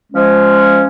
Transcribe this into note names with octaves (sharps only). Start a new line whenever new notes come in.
F3 G#3 C#4